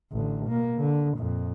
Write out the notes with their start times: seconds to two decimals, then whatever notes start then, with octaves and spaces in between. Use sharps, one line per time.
0.12 A1 D3
0.46 B2 A#3
0.77 D3
1.17 F2 A#2